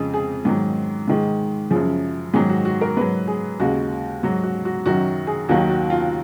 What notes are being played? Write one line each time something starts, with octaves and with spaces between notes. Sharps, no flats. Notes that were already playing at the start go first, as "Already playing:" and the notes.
Already playing: F2 C#3 G#3 G#4
G#4
G#2 D#3 F#3
G#2 D#3 G#3
F#2 C#3 F3 G#4
G#2 D#3 F#3 G#4
F#4
F#4
A#4
G#2 F#3 B4
G#4
D#2 C#3 G#3 F#4
G#2 F#3 F#4
F#4
F#4
F#2 D#3 F#3 F#4
G#4
D#2 D#3 F#3 F#4
F#4
F4